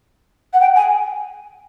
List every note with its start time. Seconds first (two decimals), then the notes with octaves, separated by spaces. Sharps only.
0.53 F#5
0.60 G5
0.75 G#5